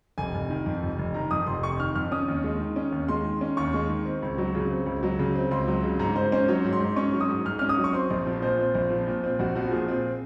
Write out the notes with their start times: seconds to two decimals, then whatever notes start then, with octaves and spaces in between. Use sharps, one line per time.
0.18 F1 G#5
0.35 F1
0.50 D#3
0.66 F2
0.83 F1
0.99 F1
1.14 D#3 A#5
1.31 F2 D#6
1.47 F1 C6
1.63 F1 C#6
1.80 D#3 F6
1.95 F2 F6
2.12 C#4 D#6
2.28 D#2
2.44 G#3
2.60 D#3
2.76 C#4
2.92 D#2
3.08 G#3 C6
3.25 D#3
3.41 C#4
3.57 D#2 C#6
3.74 G#3
3.89 D#3
4.06 C4
4.22 C#2
4.38 F#3
4.55 C#3
4.70 C4
4.86 C#2
5.03 F#3
5.19 C#3
5.36 C4
5.51 C#2 C6
5.68 F#3
5.83 C#3
6.00 G#2 A#5
6.15 G#2 C5
6.32 C#4 C5
6.48 F#3 C#5
6.64 G#2
6.73 C6
6.80 G#2
6.96 C#4 C#6
7.13 F#3
7.21 D#6
7.29 G#2
7.45 G#2 F6
7.59 C#4 F6
7.69 D#6
7.78 F#3
7.84 C#6
7.93 C4 C6
8.10 A#1
8.27 F3
8.42 A#2 C5
8.59 C4
8.75 A#1
8.91 F3
9.07 A#2
9.24 C4
9.39 A#1 F#4
9.55 F3 F#4
9.71 A#2 G#4
9.88 C4